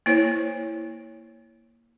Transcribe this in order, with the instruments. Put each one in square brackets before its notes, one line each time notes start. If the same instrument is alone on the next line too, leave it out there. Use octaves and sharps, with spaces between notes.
[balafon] A#3 E4 C5 C#5